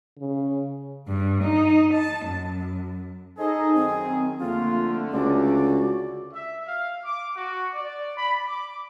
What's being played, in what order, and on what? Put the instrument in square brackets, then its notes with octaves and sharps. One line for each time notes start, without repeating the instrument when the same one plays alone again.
[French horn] C#3
[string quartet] G2
D#4
A5
F#2
[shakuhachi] D#4 [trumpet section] G#4 [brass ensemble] A4 C5 D#5
[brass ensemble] F#2 D#3 [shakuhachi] C4
[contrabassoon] F2 [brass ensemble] D3 A3 [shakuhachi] A#3 [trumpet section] F4
[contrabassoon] C#2 [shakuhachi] F#4 [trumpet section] D5
[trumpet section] E5
F5
D6
F#4
D5
B5
D6